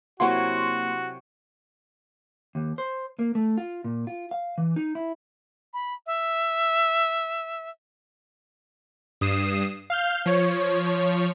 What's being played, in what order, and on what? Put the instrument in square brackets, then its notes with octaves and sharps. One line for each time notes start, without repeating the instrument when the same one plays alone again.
[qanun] C3 F#3 E4 [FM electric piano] A#3 C6 [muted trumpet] F#4 [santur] F#5 C#6
[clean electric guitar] D#2
C5
A#3
A3
F4
A#2
F4
F5
E3
D#4
E4
[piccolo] B5
E5
[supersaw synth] G2 D#6 C7 E7
F5 F6 G6
F3 C#5